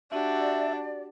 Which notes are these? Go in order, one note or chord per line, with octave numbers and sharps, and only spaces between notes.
D4 F#4 G4 D5 E5